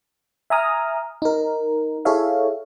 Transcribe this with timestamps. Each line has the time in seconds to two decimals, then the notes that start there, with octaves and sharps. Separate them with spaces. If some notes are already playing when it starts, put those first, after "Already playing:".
0.50 E5 G#5 A#5 D#6 F6
1.22 D#4 A#4
2.05 E4 G#4 A4 C#5 E5 F5